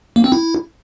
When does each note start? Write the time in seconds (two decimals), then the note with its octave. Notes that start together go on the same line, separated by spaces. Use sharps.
0.16 A#3
0.24 C4
0.32 E4